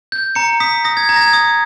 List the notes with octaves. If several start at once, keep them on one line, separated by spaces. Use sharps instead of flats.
G6
A#5 C#7
D#6 B6
D#6 A#6
G#6
A#5 G#6
A#6
G#6
D#6